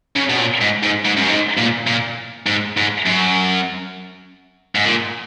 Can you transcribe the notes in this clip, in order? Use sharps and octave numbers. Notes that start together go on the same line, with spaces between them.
C#3
B2
A#2
G#2
G#2
G#2
F#2
G#2
A#2
A#2
G#2
G#2
F#2
G#2
A#2